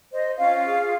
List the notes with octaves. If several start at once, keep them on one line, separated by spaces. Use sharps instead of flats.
C5 D#5
C#4 F4 F5
G#4